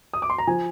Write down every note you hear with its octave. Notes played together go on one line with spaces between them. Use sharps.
D#6
D6
C6
A#5
F3 G#5